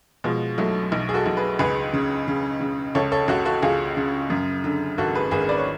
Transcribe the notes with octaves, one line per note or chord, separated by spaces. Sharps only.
B2 F3 G#3
B1 F#3 A3
B1
G#4
F#4 A4
B1
G#4 B4
C#2 G#4 B4
C#3
C#3
C#3
C#2 A4 C#5
A4 C#5
C#2 F#4 A4
F#4 A4
C#2 F4 G#4
C#3
F#2
D3
G#1 F#4 A4
G#4 B4
G#1 G#4 B4
B4 D5
C#5